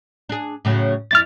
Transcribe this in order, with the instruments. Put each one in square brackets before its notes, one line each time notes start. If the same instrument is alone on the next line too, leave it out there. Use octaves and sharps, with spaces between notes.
[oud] D4 G#4
A2 C#3 F#3
[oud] F2 E4 [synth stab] F6 A6